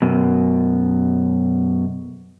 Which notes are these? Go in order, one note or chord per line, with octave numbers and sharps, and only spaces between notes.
F#2 B2